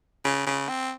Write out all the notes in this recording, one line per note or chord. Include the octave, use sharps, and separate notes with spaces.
C#3
C#3
C4